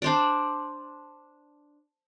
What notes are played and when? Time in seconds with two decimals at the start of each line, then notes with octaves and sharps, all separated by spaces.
0.02 D4 C5 D5